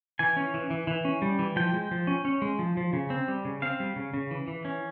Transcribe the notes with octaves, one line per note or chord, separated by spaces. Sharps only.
E3 G#5
C#4
E3
E3
E3
C#4
G3
E3
F3 G5
G#3
F3
C#4
C#4
G#3
F3
F3
C#3
C4
G3
C#3
C4 F5
G3
C#3
C#3
E3
E3
C#4